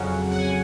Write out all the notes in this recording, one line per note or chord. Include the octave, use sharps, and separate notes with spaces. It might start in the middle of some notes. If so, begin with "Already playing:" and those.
Already playing: F2 C#3 F#3 C#4 F#5
F#5
G#5